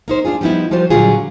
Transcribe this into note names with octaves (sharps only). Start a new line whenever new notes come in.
A#3 D#4 C5
D4 D#4 F4 G#4
F3 G3 B3 D#4 E4
F3 G3 F4 F#4 C5
A#2 D3 F#3 G3 F4 G#4